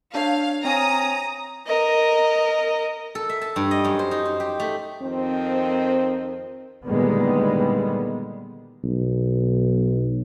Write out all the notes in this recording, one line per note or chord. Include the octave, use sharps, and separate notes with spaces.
D4 C#5 F5
C4 C#5 G#5 A#5 D#6
A#4 D#5
A4
E5
A5
G2
D#5
F#2
C5
D#4
C5
G4
A3
F2 D#3 C4
A#2 D3 D#3 G3 G#3 B3
B1